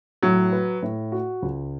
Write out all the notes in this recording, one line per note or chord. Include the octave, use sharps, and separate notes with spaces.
A2 F#3
B4
A2
F#4
C#2